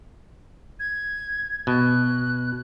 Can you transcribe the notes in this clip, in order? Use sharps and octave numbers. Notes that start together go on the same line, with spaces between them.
G#6
B2 F#6